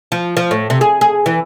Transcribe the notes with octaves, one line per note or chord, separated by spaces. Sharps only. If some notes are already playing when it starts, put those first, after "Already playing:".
F3
F3
A2
C3
G#4
G#4
E3